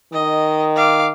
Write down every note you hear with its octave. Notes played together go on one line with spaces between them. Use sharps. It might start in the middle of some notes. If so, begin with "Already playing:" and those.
D#3 D#5
F5 D6